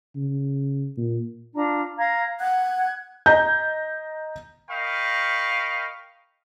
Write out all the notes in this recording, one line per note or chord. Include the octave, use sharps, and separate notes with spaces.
C#3
A#2
D4 F4 A#5
F5 A#5 G#6
F#5 F#6 G#6
D#5 A#5 G6
A#4 D#5 F5 G5 B5 C#6